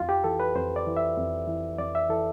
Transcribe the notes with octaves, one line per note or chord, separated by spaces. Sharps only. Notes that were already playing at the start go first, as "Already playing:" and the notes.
Already playing: F2 F4
G4
E3 A4
B4
F2 C5
D5
E3
E5
F2
E3
F2 D5
E5
E3 A4